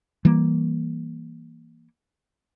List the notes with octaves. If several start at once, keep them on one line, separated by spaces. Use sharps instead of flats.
E3 G3 A#3